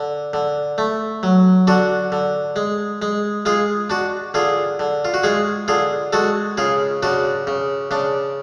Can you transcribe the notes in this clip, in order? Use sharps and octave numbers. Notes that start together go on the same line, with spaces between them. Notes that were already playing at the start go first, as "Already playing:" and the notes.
Already playing: D3
D3
A3
F#3
D3 D4 F#4
D3
G#3
G#3
G#3 F4 G#4
D4 F#4
D3 F4 G#4
D3
F4
F#4
G#3 F4 G#4
D3 F4 G#4
G#3 F#4 A4
C#3 F4 G#4
C#3 D4 F#4
C#3
C#3 D4